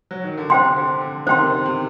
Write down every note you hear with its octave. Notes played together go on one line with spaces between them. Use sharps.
F#3
D#3
D3
C3 C5 G5 C6
D3
D3
C3 D#3 C5 G5 C6
C3